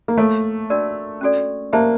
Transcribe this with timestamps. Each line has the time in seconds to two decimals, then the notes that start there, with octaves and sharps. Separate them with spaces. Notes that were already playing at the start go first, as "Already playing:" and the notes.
0.08 A#3
0.17 A3 A4 C#5 F5
0.70 D4 F#4 A#4 D5
1.21 C#4 F#4 A4 D5
1.73 A#3 G4 C5 E5 A5